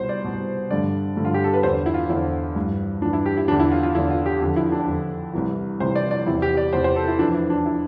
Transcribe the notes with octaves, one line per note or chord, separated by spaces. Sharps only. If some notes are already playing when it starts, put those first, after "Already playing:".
Already playing: C2 B2 C5
D5
C2 B2
G2 D3 D5
G2 D3
F4
G4
A4
B4
E2 D3 C5
E4
F4
E2 D3 E4
G2 E3
G2 E3 D4
E4
G4
E4
E2 D3 D4
E4
F4
F4
E2 D3 E4
F4
G4
F2 D3 F4
E4
D4
F2 D3
C2 C3 E3
C2 C3 E3 C5
D5
D5
E2 C3 E3 E4
G4
D5
E2 C3 E3 C5
C5
A4
E4
F2 E3 D4
E4
D4
E3 E4